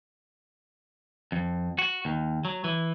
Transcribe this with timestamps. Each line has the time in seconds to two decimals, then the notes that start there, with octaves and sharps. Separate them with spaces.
1.32 F2
1.79 F#4
2.05 D#2
2.45 F#3
2.64 E3